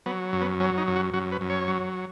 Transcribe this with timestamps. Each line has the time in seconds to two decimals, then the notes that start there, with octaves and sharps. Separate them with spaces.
0.06 F#3 B3
0.33 F#2
0.42 B3
0.60 F#3 C#4
0.78 D#4
0.87 F#2
0.96 F#4
1.13 F#2 F#4
1.32 B4
1.41 F#2
1.50 C#5
1.68 F#3